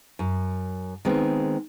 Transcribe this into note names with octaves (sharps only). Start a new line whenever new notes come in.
F#2
D#3 G#3 B3 C4